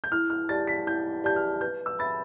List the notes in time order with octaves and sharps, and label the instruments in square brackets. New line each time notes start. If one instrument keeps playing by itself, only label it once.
[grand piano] G6
[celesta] E4 [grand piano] F6
[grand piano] F6
[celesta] G4 D5 A5 [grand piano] A6
[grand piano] B6
[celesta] E4 [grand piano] G6
[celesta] G4 D5 A5 [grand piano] G6
[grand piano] F6
[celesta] B4 [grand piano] G6
[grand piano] E6
[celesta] E5 B5 [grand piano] A6